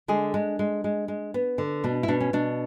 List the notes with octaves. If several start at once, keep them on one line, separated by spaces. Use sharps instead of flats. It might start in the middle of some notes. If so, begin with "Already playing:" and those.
D3 G#3 G#4
G#3 D4
G#3
G#3
G#3
B3
D3
B2 D4
E4
B2 D4
C#4
B2 D4